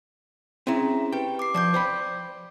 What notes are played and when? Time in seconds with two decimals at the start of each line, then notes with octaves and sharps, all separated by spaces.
0.67 C4 C#4 E4 G#4 A#5
1.13 G4 B4 G5
1.39 D6 C7
1.54 F3 D5 D6 G6
1.74 C5 G5 B5